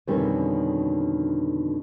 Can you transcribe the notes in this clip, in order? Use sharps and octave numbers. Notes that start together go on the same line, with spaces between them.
F2 B2 D3 D#3 G3 C#4